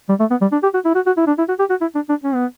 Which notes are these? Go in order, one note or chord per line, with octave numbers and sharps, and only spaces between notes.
G3
A3
B3
G3
D4
G4
F#4
E4
F#4
F#4
E4
D4
E4
F#4
G4
F#4
E4
D4
D4
C#4
B3